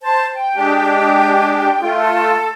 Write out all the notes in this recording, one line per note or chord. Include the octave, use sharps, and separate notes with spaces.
C5 A5
G5
G#3 D4 G4
A3 F4
A4